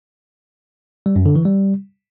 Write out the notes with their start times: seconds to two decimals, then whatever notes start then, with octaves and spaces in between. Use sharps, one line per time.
1.06 G3
1.16 F#2
1.26 D3
1.36 E3
1.45 G3